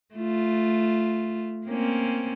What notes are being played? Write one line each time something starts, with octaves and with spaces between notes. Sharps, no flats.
A3 F4
A#3 C4 C#4